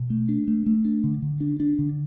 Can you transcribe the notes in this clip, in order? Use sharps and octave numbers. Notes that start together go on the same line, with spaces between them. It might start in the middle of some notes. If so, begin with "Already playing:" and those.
Already playing: B2
A3
D4
A3
A3
D4
D3
D3
D4
D4
D3